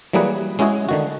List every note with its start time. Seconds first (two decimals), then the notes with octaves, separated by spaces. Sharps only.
0.13 E3 F#3 G3 A#3 G#4 B4
0.59 G#3 C#4 E4 F#4 G#4
0.89 D3 D#3 F#4